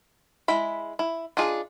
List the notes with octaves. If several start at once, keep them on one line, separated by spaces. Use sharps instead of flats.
G#3 E4 B5
E4
D4 D#4 F4 G#4